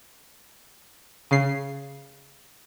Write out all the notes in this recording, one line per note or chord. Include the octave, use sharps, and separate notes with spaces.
C#3 C7